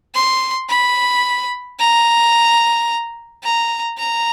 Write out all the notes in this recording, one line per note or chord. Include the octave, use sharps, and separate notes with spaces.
C6
B5
A#5
A#5
A#5